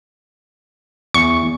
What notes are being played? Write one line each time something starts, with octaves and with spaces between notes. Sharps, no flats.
E2 C#6